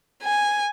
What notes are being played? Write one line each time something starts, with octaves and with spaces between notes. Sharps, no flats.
G#5